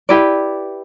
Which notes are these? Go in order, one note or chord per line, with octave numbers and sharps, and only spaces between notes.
E4 G4 B4 D5